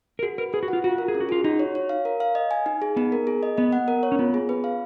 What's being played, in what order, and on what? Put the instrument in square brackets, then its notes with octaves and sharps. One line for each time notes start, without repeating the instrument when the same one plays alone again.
[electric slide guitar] A#4
[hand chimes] F#4 [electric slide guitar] G#4
[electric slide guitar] A#4 [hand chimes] B4
[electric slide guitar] G#4 [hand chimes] B4
[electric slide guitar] F#4
[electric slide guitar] F4 [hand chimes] F#5
[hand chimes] F4 [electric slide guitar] F#4
[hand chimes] A#4
[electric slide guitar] G#4
[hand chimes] C#4
[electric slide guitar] F#4
[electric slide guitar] F4 [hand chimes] G#4
[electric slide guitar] D#4 [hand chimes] F#4
[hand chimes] C#5
C#5
F5
A#4
F5
D#5
G#5
D#4
G#4
[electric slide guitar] B3 [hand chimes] D#4
[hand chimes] A#4
G#4
D#5
[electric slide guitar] B3 [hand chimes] D#5
[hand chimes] F#5
A#4
C#5
[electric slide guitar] C#4
[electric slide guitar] B3 [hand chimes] F4
[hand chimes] G#4
B4
F5